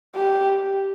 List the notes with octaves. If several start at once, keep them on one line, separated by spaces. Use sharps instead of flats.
G4